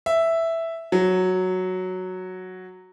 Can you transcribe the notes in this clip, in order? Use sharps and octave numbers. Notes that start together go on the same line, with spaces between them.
E5
F#3